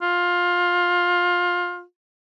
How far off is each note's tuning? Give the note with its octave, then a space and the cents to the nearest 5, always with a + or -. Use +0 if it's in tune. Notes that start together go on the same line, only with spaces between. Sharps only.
F4 +20